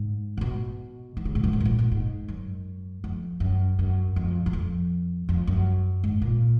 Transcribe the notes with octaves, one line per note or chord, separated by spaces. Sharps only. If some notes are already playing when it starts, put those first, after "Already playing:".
Already playing: G#2
C#3
B2
D#3
C#3
G#2
F#2
G#2
B2
A#2
A#2
G#2
F#2
F2
F#2
F#2
F2
F#2
F2
F2
F#2
G#2
A#2